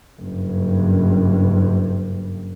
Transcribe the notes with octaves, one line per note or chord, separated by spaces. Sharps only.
F#1 G2